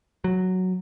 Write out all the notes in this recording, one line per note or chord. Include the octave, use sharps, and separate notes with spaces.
F#3